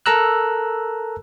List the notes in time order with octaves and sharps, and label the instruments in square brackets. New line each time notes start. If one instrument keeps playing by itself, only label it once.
[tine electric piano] A4 A#4 A#5 E6 F#6